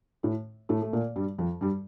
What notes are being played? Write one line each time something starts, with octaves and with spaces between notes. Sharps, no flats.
A2 A3
A2 A3
A3
A#2 A#3
G2 G3
F2 F3
G2 G3